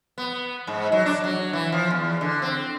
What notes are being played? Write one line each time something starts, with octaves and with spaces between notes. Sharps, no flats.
B3
G#2
F#3
D4
F#3
E3
F3
E2
D3
C4